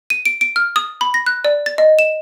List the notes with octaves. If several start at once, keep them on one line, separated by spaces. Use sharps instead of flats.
D#7
D7
D7
F6
D#6
B5
A#6
F#6
D5
A6
D#5
E7